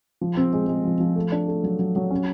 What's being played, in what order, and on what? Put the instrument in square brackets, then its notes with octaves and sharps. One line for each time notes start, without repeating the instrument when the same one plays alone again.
[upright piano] F3
C4
G#3
G#3
F3
F3
A3
D4
A3
F#3
F#3
F#3
C#4